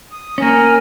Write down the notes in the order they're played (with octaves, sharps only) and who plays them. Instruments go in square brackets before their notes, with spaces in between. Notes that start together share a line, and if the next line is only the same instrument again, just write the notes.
[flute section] D#6
[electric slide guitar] A#3 C#4 [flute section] A#4 G#5